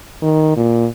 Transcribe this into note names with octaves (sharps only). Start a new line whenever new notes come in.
D#3
A#2